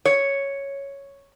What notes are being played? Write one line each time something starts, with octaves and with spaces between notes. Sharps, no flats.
C#5